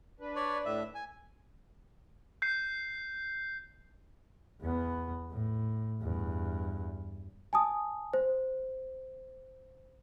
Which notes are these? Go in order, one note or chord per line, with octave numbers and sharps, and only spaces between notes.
D4 B4
C#5 D5
A2 E5
G#5
G6 C7
E2 B3
A2
E2 G2
G#5 A5 D#6
C5